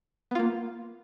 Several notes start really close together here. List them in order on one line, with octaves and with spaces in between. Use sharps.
B3 F4 A#3